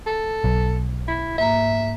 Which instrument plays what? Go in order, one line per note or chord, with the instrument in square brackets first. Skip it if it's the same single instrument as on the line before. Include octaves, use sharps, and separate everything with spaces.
[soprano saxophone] A4
[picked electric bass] B1
[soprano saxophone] E4
[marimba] G#2 A#3 A#5 [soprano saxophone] E5